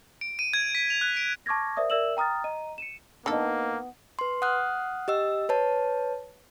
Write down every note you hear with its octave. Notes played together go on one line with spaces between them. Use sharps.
D7
D#7
G#6
B6
F7
F#6
D7
A5 C#6 D6 F6 G#6 A#6
A#4 C5 D5 E5 D#6
A#4 D5 E5 E6 E7 F#7
G5 A#5 D#6 F6 A6
D#5 A#5 D#7
C#7 D#7 E7
D3 A#3 B3 D#4 A4 D#5
B4 C6
F#5 D#6 F6 F#6
G4 D#5 E6
B4 C#5 A5